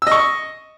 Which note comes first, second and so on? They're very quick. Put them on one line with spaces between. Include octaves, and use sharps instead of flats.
E6 D#5 C#6